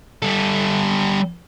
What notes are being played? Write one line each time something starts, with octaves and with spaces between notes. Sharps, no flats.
G3 A4